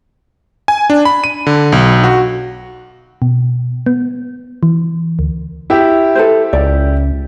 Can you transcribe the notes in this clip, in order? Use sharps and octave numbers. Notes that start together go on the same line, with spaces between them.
G#5
D4
B5
D#7
D3
B1
F#4
B2
B3
E3
D2
E4 G4 E5
A4 B4 C5
C#2 D5